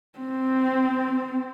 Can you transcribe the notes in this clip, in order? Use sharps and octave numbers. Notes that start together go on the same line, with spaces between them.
C4